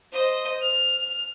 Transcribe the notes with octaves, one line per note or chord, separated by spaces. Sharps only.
C5 D#5
F6